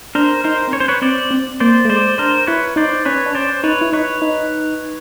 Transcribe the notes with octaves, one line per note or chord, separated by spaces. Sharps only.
D4 A#4 C5
D#4 A#4 C5
C4
C#4 C#5
C5
B4 C#5
C4 C5 D5
C4
A#3 C5 D5
A3
G#3 C5 D5
D4 A#4 C5
E4 B4 C#5
D#4 C5 D5
C#4 B4 C#5
D4
C#4 C5 D5
D#4 B4 C#5
E4
D#4 B4 C#5
D#4